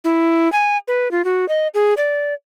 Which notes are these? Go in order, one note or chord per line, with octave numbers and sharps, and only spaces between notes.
E4
G#5
B4
F4
F#4
D#5
G#4
D5